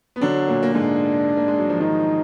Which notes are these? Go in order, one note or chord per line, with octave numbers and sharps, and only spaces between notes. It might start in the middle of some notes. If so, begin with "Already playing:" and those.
B3
D3 F#3 D4
A#2 A#3
A#3
G#2 G#3 D4
A#3
G#3
F#3
F3
D#3 D#4